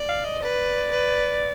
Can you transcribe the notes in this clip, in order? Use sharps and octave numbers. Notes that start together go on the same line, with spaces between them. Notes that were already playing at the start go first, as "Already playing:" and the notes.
Already playing: D5
F5
D#5
B4 D5
B4